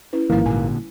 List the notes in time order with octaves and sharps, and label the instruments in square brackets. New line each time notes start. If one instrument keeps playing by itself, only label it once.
[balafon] C#4 E4 B4
[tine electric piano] A1 G#2 A#3 [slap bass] D#3 F3 [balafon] G3 E4
[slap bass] A#2 D3 [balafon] G#5